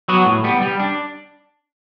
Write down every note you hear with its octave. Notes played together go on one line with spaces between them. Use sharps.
F#3 B3 F#4
A2
G3 B3
G3
D4